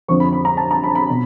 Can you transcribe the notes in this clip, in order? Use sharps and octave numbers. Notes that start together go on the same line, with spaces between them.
F2 D3 F3 C#6
B5
B5
A#5
A5
A#5
B5
B5
B2